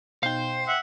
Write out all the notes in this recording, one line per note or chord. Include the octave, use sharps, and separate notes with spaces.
B2 D#4 C5 F5 G5
E5 F#5